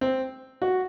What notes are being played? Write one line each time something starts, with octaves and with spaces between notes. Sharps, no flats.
C4
F#4